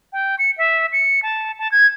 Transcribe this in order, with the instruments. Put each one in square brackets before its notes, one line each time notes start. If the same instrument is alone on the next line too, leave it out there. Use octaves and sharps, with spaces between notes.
[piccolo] G5
C#7
E5
C#7
A5
A5
G#6